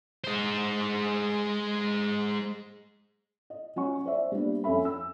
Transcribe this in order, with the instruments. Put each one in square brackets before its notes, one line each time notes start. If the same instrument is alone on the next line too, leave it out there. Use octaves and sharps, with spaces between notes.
[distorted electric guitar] G#3 C5
[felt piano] D#5
F#3 C#4 F#5 C#6
C5 D5 E5
G3 A#3 B3 D4
F2 C#4 A4 E5 B5
E6